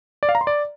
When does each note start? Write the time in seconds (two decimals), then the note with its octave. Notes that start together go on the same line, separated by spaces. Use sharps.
0.23 D5
0.29 F5
0.35 A#5
0.41 C6
0.47 D5